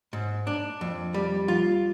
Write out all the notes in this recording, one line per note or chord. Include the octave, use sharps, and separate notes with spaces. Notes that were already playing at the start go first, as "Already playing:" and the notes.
G#2
D4
F2
G3
F4